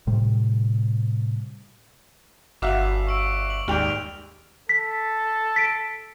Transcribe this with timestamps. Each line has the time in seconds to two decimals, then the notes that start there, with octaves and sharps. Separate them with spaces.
0.07 A2 C3 G3
2.62 G1 F#4 E5 F5 D6
3.07 C#6 E6 D7
3.50 F#7
3.68 D#2 G#2 G3 G5 F6 D7 F7
4.69 A4 B6
5.56 B6 D7